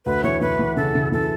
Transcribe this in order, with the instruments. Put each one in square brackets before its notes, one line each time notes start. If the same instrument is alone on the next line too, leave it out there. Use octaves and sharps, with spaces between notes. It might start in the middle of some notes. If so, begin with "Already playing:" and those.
[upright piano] D2 [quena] B4
[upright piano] E3 [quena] C#5
[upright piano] E3 [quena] B4
[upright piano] E3
[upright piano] C#3 [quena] A4
[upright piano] C#3
[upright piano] E3 [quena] A4